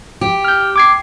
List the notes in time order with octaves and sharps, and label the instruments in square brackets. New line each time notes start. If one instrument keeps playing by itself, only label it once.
[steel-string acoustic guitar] G4
[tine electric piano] F6 G6
D6 G#6 C7